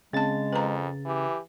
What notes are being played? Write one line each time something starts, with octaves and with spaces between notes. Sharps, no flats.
C#3 G#3 C4 A5 A6
F2 B4 A#5
E3 G4